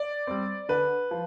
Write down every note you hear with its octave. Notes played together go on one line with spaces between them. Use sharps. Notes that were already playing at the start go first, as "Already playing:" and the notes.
Already playing: D5
G3 C4
D3 B4
F3